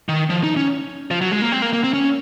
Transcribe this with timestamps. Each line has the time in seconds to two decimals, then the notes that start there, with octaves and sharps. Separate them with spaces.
0.09 D#3
0.30 F3
0.43 D#4
0.57 C#4
1.11 F3
1.21 F#3
1.32 G#3
1.42 A#3
1.52 C4
1.62 A#3
1.73 A#3
1.84 C4
1.93 C#4